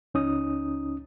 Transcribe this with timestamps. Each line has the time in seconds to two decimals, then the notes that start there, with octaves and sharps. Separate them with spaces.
0.14 C#2 C#4 D#4 D#6